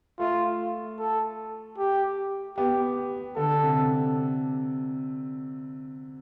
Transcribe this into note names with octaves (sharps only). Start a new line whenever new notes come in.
A3 F4
A4
G4
B3 G4
D3 A4
C3